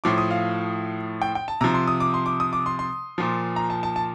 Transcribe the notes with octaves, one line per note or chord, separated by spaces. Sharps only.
A2 F3 D6
D#6
F5
G5
G5
A5
C3 F3 A#5
C6
D#6
D6
C6
D6
D#6
D6
C6
C6
A#2 F3
A#5
A5
A5
A5